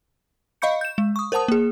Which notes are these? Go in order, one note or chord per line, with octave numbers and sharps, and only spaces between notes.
D#5 F5 B5 C#6 G6 C#7
G6 E7
G#3
C#6 D#6
A#4 C5 F#5 A5 D#6
A#3 G#4